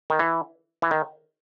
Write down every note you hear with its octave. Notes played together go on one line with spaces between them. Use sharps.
D#3
E3
E3
D#3